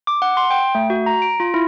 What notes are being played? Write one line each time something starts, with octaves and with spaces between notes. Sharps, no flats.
D6
F#5
C6
G5
A3
F#4
A#5
D7
F4
E4